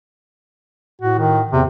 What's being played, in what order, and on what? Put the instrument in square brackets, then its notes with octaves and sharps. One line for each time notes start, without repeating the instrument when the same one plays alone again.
[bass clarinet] A2 [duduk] F#4
[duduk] D#3
[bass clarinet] E2 [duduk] C3